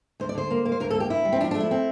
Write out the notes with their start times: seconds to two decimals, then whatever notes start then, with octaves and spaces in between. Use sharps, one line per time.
0.20 D2 C5
0.29 D5
0.35 D3 C5
0.50 A#3
0.65 A#3
0.72 C5
0.80 D2 A#4
0.90 A4
0.95 A#3 G4
1.10 D2 E4
1.25 G3
1.33 C4
1.40 F3 D4
1.51 A3 D4
1.61 E4
1.71 C4